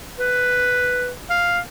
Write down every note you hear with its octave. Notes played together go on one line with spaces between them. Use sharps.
B4
F5